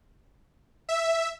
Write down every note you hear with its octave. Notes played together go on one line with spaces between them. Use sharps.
E5